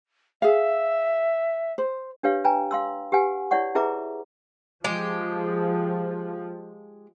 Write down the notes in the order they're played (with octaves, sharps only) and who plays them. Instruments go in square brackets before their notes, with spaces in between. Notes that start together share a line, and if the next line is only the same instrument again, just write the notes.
[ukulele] G#4 F5 [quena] E5
[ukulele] C5
[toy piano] D4 G4 B4 C#5 F5
B4 G5 G#5 A#5
F5 C6 E6
G4 B4 F#5 G#5
E4 C#5 D5 F#5 C#6
E4 G#4 B4 E5 A#5 D6
[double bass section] F3 [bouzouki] G#3 G4